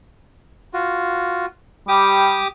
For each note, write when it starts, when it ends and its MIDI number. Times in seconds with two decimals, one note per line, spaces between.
0.73 1.46 65
0.73 1.46 66
1.88 2.39 55
1.88 2.48 67
1.88 2.48 86
1.88 2.48 87